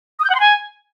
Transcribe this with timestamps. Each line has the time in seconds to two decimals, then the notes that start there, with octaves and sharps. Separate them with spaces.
0.19 D#6
0.25 G6
0.30 F#5
0.35 C6
0.40 G#5